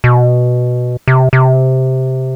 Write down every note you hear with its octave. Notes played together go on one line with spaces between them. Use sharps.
B2
C3
C3